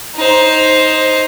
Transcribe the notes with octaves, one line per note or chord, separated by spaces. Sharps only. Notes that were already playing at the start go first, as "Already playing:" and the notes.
D#4 C5